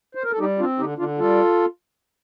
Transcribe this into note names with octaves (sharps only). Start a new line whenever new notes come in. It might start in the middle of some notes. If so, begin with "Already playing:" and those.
C5
A#4
A4
G3 D#4 G4
C4 D4 F4
D3 D#4 G4
D3 D4 F4
G3 F4 A4